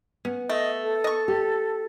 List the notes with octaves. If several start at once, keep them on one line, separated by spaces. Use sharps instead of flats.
B3 C#4
A3 D#5
A4
D#5 C#6
G4